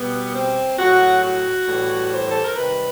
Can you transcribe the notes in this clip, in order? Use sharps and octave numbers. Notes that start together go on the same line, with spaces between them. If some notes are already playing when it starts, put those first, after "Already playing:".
Already playing: B2 G3 B3
C4
A2 F#3 F#4
F#4
A2 E3 G3
C5
A4
A#4
C3 D#3 G3 B4